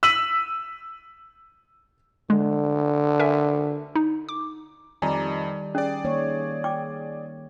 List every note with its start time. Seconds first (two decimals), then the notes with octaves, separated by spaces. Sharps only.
0.03 E6 B6 D#7 F#7
2.30 D3 G#3
3.19 A#4 E5 G#5
3.95 D#4
4.29 D6
5.02 F2 D#3 G3 D5 D#5 G#5 A#5
5.75 C#4 G#4 D5
6.04 D#3 A#3 C#5
6.64 G5 D6